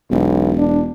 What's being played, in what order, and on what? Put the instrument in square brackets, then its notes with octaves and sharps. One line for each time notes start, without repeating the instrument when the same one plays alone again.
[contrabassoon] E1 [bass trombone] B1
[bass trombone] D4